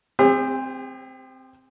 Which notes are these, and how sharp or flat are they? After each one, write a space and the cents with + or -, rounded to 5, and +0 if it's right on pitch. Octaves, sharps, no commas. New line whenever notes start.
C4 -5 G#4 -45